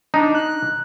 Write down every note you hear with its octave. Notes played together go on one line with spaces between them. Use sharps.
D4 D#4
F#6